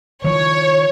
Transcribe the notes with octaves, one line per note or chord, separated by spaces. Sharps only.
D#3 F3 C#5